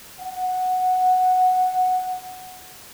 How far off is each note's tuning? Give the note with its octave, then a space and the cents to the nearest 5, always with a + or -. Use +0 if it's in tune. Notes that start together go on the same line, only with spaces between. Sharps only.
F#5 -5